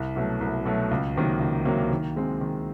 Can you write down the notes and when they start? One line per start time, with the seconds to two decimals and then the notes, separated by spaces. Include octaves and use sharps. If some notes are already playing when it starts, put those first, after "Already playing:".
Already playing: C2
0.16 B2 F#3 A3
0.41 C2
0.65 B2 F#3 A3
0.91 C#2
1.16 C3 D#3 F#3 A#3
1.40 C#2
1.65 C3 D#3 F#3 A#3
1.91 D#3
2.16 G#3 C4
2.41 D#3